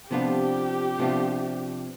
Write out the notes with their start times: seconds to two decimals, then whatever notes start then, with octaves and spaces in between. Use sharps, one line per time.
0.11 C3 F3 B3 D4 F4 G4
0.99 C3 F3 B3 D4 F4